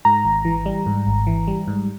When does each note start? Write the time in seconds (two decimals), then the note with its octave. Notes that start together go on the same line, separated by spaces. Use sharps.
0.05 G#2 A#5
0.25 G#1
0.45 E3
0.66 G3
0.86 G#2
1.06 G#1
1.27 E3
1.48 G3
1.68 G#2